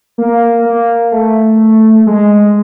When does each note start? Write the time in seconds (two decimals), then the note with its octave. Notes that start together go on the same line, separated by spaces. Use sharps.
0.18 A#3
0.66 A#3
1.12 A3
2.07 G#3